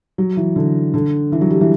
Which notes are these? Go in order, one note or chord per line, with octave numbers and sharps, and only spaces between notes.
F#3
E3
D3
D3
E3
F#3
G3
E3